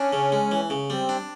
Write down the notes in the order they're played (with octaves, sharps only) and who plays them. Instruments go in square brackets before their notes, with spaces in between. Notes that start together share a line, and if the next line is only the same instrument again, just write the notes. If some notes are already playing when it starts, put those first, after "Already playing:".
Already playing: [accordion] C#4 [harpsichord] D4
[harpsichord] C#3
G#3
E3
C#3
[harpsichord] G3 [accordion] C4
[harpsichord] D4